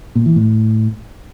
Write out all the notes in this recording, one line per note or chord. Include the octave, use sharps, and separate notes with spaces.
A#2
E3
A2